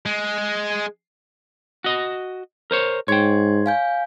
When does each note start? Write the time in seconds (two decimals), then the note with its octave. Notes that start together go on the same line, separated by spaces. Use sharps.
0.06 G#3
1.84 F#4 D#5
2.71 A#4 C5 C#5
3.08 G#2 C#5 G5 C6 G#6
3.66 F5 G#5 G6